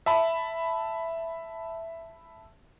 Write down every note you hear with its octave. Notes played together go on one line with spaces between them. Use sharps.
E5 A5 B5